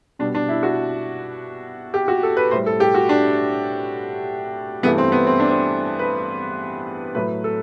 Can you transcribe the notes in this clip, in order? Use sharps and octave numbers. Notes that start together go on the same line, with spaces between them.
B2 G3 D4
D4
E4
F#4
G4
F#4
A4
B4
A2 G3 C5
A4
G4
F#4
D4
G2 E3 A3 B3
C4
B3
C4
D4
C4
B4
A2 F#3 A3 B4
A4